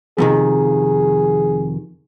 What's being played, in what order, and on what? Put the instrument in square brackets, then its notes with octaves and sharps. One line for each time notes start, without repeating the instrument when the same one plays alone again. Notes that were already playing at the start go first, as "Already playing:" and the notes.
[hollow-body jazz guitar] F2 C3 D#3 [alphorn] G#4